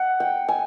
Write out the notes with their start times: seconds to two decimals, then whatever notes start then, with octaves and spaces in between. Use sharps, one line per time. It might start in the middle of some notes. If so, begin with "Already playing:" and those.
Already playing: F#5
0.20 G5
0.49 G#5